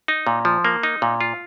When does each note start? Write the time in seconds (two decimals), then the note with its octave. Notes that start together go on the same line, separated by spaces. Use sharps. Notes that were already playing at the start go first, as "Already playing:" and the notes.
0.08 D#4
0.27 A#2
0.45 F3
0.65 A#3
0.83 D#4
1.02 A#2
1.21 F4